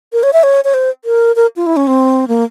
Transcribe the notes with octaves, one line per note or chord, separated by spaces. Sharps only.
A#4
C#5
E5
C#5
C#5
C5
A#4
A#4
F4
E4
C#4
C4
A#3